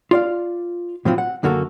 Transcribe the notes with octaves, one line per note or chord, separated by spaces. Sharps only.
F4 D5 F5
A2 F3 F#3 C4 F4
F#5
F#2 D3 A#3 F#4 A4